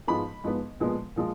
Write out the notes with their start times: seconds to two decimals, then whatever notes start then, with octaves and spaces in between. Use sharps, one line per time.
0.08 G#2 F3 G#3 B3 B5
0.44 G#2 F3 G#3 B3
0.80 A#2 F3 G#3 B3
1.16 A#2 F3 G#3